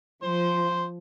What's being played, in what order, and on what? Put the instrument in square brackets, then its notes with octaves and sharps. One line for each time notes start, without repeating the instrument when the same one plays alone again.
[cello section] F3 [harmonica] C5 C6